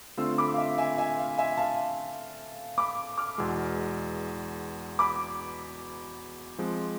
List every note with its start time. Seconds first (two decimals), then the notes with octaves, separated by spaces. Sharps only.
0.17 D3 A3 C4 F4 C6 E6
0.38 B5 D6
0.53 F5
0.58 E5
0.78 E5 G#5
0.98 E5 G#5
1.17 F5
1.38 E5 G#5
1.57 F5 A5
2.78 B5 D6
3.18 D6 F6
3.38 E2 B2 G#3 C6 E6
4.99 B5 D6
6.58 F3 G#3 C4